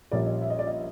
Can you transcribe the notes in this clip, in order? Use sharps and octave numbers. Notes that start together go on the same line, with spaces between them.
A#1 A#2 G3 A#3 C#4 D5
D#5
E5
D#5
D5
D#5